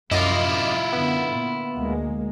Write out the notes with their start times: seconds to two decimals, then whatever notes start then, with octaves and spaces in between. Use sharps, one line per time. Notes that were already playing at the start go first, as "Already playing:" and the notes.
0.11 C2 F#2 A2 F3 E4 F4 D#5 D6
0.93 F#2 D3 B3
1.32 A#2
1.76 D2 G#3 A#3